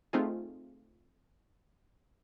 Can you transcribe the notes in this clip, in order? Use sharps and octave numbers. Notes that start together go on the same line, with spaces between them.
A3 C4 D#4 F4 G#4